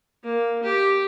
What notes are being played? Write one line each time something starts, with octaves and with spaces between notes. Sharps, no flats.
A#3
G4